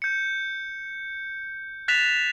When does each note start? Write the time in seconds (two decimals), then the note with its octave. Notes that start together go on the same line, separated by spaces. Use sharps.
0.02 G6 C#7
1.88 F#6 A6 B6 E7 F7